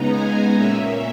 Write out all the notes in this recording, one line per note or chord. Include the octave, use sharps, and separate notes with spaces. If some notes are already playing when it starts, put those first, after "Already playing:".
Already playing: C#3 G#3 B3 D#4 A#5
G#5
A#2 A#3 C#4 E5